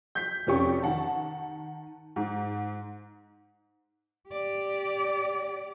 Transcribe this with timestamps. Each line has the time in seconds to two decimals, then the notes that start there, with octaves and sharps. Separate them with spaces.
0.15 G6 B6
0.47 F1 F2 C#4 G4 C#6
0.82 D#3 F#5 A5
2.16 G#2
4.29 G4 D5